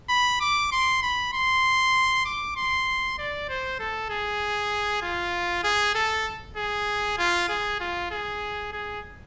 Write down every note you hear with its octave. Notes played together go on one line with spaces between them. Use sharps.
B5
D6
C6
B5
C6
D6
C6
D5
C5
A4
G#4
F4
G#4
A4
G#4
F4
G#4
F4
G#4
G#4